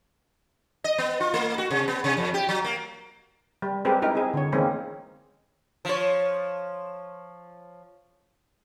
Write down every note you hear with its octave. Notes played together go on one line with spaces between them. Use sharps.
D#5
B3
F4
A3
F#4
C3
B3
C3
F2
G4
F#3
A#3
G3
G#3 C4 G4 G#4 A#4 B4
D#4 E4 A#4
C4 G#4
D3 C#5
D#3 E3 G#3 A#3 C4 C#4
F3 C#5